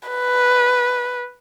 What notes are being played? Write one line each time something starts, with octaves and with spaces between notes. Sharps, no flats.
B4